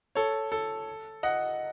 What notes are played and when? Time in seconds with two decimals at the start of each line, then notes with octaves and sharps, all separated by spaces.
0.15 A4 C#5
0.52 A4
1.23 D#5 F#5